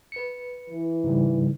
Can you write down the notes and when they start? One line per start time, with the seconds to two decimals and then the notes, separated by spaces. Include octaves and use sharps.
0.12 B4 C#7
0.70 E3
1.04 G#2 C#3 G3